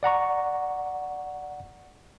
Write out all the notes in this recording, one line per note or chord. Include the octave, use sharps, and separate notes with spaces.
D5 F#5 A#5 C#6